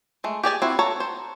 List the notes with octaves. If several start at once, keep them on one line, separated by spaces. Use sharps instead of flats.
G#3 A3
G4 G#4 D5 G#5
C4 E4 F#4
A4 C#5 A#5
C5